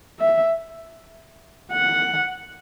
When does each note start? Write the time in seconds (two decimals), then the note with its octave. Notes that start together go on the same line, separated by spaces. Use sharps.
0.19 E5
1.72 F#5